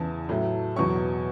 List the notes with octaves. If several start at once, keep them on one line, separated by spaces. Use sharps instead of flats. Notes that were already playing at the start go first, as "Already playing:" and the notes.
Already playing: E2 C#3 E3 A5
A2 F#3 A3
E2 B2 F#3 C#4 C#6